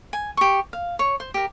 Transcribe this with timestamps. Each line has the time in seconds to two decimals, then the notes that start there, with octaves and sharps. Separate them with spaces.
0.13 G#5
0.37 G4 C#6
0.73 F5
0.99 C#5
1.20 C5
1.34 G4 A#4